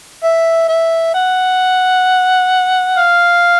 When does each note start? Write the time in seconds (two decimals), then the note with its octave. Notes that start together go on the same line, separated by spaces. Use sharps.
0.24 E5
0.69 E5
1.15 F#5
2.97 F5